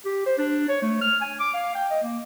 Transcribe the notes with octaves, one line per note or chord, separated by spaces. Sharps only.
G4
C5
D4
C#5
A3
F6
G#5
D6
F5
G5
D#5
A#3